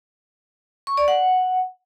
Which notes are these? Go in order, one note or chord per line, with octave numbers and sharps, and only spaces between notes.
C#6
D5
F#5